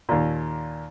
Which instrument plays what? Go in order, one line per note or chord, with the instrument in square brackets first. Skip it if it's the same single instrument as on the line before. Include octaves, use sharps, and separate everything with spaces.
[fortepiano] D#2 A#2